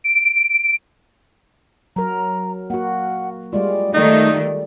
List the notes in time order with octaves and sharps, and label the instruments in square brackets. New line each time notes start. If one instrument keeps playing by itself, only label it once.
[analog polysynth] D7
[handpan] F#3 A#4 [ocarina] A#5
[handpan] A#3 F#4 [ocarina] F#5
[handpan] G3 G#3 F4 [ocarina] D5
[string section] D#3 A3 [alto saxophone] D#4 [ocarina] D5